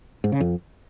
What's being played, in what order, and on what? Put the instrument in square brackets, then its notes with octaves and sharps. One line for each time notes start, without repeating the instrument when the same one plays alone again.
[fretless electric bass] G#2
C#3
F2